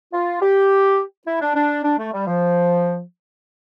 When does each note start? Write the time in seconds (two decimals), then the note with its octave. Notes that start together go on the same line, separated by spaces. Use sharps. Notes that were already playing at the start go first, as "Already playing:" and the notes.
0.13 F4
0.42 G4
1.27 E4
1.41 D4
1.56 D4
1.84 D4
1.99 A3
2.13 G3
2.27 F3